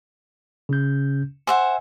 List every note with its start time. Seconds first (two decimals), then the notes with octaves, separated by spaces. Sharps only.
0.69 C#3 C#4 G6
1.47 C5 E5 F#5 G#5